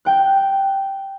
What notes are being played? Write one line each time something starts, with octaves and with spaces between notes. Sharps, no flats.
G5 F#6